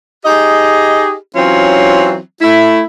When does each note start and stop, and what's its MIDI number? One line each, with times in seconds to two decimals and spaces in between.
0.24 1.12 63
0.24 1.12 67
0.24 1.12 68
0.24 1.12 75
1.36 2.17 52
1.36 2.17 54
1.36 2.17 60
1.36 2.17 61
1.36 2.17 65
2.42 2.81 57
2.42 2.81 64